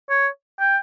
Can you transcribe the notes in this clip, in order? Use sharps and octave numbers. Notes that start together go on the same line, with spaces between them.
C#5
G5